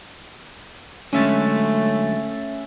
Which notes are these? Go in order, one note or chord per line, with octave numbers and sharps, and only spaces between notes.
D3 F#3 G#3 A3 C#4 E5 A6